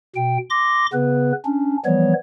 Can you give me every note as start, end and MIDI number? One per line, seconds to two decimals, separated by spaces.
0.16 0.38 47
0.16 0.38 79
0.50 0.86 84
0.50 0.86 86
0.50 0.86 94
0.93 1.32 49
0.93 1.32 59
0.93 1.32 71
1.45 1.77 61
1.45 1.77 62
1.85 2.13 52
1.85 2.13 53
1.85 2.13 55
1.85 2.13 59
1.85 2.13 73